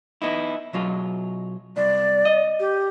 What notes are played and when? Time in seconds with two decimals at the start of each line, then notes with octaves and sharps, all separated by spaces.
0.22 B3 D#4 E4
0.73 B2 F#3 F4
1.76 C2 D5
2.25 D#5
2.60 G4